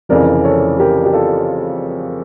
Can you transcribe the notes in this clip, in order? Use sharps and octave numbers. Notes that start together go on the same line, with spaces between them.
F1 F2 C#3 E3 A#4 D5
A4 C#5
G4 A#4
G4
F4 A4